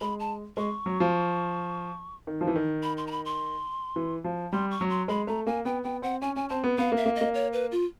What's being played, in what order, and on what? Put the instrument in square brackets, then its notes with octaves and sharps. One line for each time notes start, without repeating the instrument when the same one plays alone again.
[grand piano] G#3 [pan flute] B5
[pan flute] A5
[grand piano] G#3 [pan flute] C#6
[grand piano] F#3
F3
D#3
F3
E3
D#3
[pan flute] B5
C6
A#5
B5
C6
[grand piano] E3
F3
[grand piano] G3 [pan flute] C6
[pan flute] C#6
[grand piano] F#3
[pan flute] C6
[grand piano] G#3 [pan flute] B5
[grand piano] A3 [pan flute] A#5
[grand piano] A#3 [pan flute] G#5
[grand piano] B3 [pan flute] G5
[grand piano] B3 [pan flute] G5
[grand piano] C4 [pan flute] F#5
[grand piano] C#4 [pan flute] G#5
[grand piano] C#4 [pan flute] G#5
[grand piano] C4 [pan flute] A5
[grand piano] B3
[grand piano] B3 [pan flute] F5
[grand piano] A#3
[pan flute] E5
[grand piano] A#3
[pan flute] D#5
[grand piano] A#3
[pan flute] C#5
B4
F4